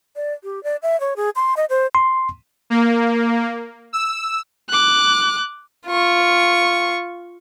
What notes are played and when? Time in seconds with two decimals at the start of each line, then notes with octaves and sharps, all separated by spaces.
0.16 D5
0.44 G4
0.63 D5
0.82 E5
1.00 C#5
1.16 G#4
1.36 C6
1.57 D#5
1.69 C5
1.95 C6
2.70 A#3
3.93 E6
4.69 D6 F#6
5.87 F4 C#6